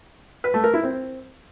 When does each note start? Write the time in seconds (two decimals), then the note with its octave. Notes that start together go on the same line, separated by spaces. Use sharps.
0.44 B4
0.54 A3
0.64 A#4
0.74 E4
0.84 C4